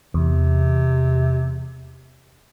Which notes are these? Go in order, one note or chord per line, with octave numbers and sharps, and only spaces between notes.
E2 C3